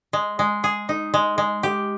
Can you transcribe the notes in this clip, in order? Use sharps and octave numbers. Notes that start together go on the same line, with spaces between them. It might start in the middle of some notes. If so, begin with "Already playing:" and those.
G#3
G#3
G#4
D#4
G#3
G#3
G4